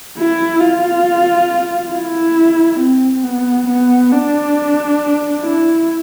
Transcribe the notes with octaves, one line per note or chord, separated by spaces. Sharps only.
E4
F4
E4
C4
B3
B3
D4
E4